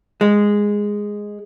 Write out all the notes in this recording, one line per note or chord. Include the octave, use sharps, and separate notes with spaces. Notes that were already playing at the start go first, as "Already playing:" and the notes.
G#3